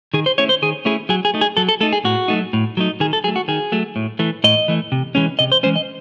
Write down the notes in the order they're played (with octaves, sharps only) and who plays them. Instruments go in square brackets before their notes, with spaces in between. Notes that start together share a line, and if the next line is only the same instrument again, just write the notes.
[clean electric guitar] D#3 G#4
C5
A3 C#4 E4 C#5
C5
D#3 G#4
A3 C#4 E4 G#4
F#3 G#4
G#4
A3 D#4
G#4
F#3 A4
A4
A3 D#4 A4
G#4
A2 F#4
F#3 A3 D#4
A2
F#3 A3 D#4
D#3 G#4
A4
F#3 G#4
A3
F#4
D#3 G#4
F#3 A3
A2
E3 A3
A2 D#5
E3 A3
C3
E3 G#3 C#4
C3 D#5
C5
E3 G#3 C#4 C5
D#5